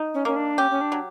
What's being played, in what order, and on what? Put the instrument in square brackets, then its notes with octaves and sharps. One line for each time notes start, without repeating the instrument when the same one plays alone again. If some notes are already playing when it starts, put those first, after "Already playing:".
Already playing: [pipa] D#4
[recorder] C#4
[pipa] A#3 [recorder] C#4
[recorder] D4
[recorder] C#4 [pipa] G4
[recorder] C#4
D4
[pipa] F#3